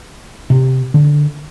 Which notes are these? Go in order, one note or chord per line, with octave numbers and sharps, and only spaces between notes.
C3
D3